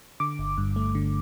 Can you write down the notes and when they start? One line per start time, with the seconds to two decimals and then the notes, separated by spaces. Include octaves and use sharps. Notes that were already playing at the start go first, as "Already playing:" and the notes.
0.20 D3 D6
0.39 G1
0.58 G2
0.76 A3
0.95 D3